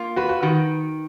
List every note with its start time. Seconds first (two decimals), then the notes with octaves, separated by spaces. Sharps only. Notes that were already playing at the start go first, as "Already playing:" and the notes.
Already playing: A#3 F4
0.16 F#4 B4
0.29 F#4
0.42 D#3 F#4